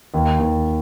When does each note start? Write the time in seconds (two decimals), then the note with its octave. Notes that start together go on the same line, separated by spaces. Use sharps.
0.14 D#2
0.40 D#2